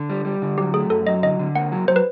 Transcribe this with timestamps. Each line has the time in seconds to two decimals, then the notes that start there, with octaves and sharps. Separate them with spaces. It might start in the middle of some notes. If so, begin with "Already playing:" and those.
Already playing: D3
0.10 G3
0.25 G3
0.42 D3
0.58 F#3 G4
0.74 A3 G#4
0.90 F#2 A4
1.07 F#3 D#5
1.23 D3 D#5
1.39 D3
1.55 A#3 F#5
1.72 F#3
1.88 F#3 C5
1.96 B4